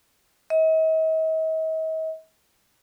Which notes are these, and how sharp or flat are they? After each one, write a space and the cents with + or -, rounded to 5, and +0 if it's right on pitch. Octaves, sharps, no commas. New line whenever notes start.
D#5 +45